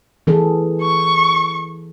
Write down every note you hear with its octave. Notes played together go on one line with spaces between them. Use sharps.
E3 G#4 A4
C#6